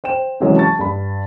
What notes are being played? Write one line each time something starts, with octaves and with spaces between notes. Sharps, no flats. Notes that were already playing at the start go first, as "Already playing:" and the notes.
C5 G5 E7
C3 E3 F#3 G#3 C#4
A5 C#6 A6
G2 B5